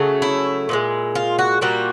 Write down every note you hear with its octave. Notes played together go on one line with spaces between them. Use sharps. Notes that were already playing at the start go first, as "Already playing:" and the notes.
Already playing: C#3 F#3 A3
E4
A#2 F3 G#3
F4
F#4
A#2 G3 A#3 F#4